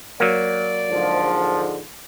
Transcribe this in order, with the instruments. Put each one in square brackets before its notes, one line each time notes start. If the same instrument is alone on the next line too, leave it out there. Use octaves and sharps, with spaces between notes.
[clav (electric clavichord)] F#3 A#3 [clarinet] D5
[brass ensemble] G#2 D3 F3